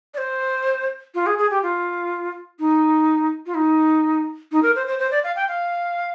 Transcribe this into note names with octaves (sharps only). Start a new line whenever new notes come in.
D5
C5
F4
G#4
G#4
G4
F4
D#4
F4
D#4
D#4
A#4
C5
C5
C5
D5
F5
G5
F5